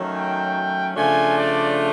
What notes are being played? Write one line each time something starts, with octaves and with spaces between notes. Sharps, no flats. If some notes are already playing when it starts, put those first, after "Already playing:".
Already playing: D#3 F#3 A3 C#4
G5
C#3 F3 A3 D4 F4 G#5
D5